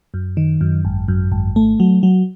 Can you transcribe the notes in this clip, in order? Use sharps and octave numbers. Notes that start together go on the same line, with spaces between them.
F#2
D#3
F#2
G#1
F#2
G#1
A3
F#3
F#3